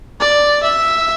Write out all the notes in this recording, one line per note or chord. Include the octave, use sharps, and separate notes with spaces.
D5
E5